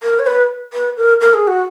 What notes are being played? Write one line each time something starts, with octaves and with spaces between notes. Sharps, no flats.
A#4
C#5
B4
B4
A#4
A#4
G#4
F#4